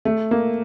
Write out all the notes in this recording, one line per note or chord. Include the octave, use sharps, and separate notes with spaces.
A3
A#3